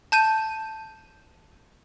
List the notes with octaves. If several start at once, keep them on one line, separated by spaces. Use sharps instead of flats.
A5 G6 D#7